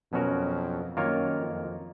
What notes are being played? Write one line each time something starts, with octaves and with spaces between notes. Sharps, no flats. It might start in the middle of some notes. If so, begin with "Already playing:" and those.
F2 B2 F#3 C#4 F#4 A#4
F#2 D#3 A#3 F4 A#4 C#5
F2